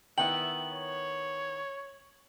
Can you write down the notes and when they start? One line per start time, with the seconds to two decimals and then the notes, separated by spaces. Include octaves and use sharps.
0.18 D#3 B3 E4 E5 G5 F#7
0.71 C#5